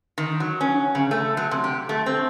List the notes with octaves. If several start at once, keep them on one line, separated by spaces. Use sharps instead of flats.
D#3
F#3
C#4
C#3
A3
F#3
C3
G4
A3
C4